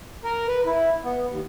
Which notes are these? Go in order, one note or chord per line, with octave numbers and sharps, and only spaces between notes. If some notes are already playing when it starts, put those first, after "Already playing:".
A#4
B4
E4
B3
D#2